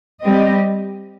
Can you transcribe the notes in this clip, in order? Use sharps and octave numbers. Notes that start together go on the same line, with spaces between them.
G3 C4 G4 D#5